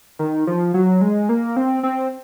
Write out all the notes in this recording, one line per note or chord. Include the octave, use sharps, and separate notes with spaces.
D#3
F3
F#3
G#3
A#3
C4
C4